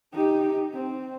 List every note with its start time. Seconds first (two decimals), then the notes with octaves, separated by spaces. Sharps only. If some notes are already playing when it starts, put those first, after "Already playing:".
0.12 D#4 G4
0.73 C4